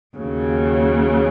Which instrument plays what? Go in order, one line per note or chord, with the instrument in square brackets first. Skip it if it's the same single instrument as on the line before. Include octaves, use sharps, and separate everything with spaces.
[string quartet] D#2 C#3 F#3